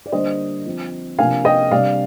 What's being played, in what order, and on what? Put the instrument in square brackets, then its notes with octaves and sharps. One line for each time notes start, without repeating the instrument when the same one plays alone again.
[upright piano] D5
D3 G3 A#3 D4 C5 D#5
F3 C4
C3 F3 A#3 D4 F5 G#5
D#5 G5
C3 G3 A#3 D4 D5 F5